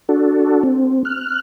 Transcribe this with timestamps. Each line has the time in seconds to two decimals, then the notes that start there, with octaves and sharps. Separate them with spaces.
0.09 D4 F#4 A4
0.63 C4
1.05 F6 F#6